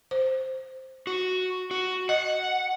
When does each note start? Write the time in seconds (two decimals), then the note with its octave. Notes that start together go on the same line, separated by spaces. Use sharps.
0.11 C5
1.07 F#4
1.71 F#4
2.09 D#5 F#5